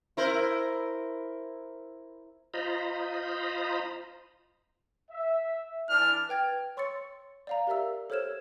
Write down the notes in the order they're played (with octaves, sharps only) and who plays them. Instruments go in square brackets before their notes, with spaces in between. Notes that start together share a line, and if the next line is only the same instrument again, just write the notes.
[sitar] E4 A#4 C5
[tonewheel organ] F4 C5 D#5 A#5 B5
[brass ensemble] E5
[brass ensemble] E3 D4 [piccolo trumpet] F6
[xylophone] B4 G5 G#6 A6
C#5 C6 C#6 E6 A6 C#7
D5 F5 A#5
G4 A#4 D5 E5 E6
A4 C5 C#5 F6 G#6 E7